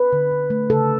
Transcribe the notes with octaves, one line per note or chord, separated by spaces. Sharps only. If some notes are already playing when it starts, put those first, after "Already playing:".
Already playing: B4
D3
D3
A3
C#3 A4